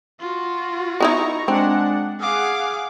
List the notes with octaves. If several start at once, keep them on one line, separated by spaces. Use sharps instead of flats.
F4 F#4
B3 D#4 E4 A#5 C#6
G#3 C4 D4 F#5
G#4 F5 F#5 D6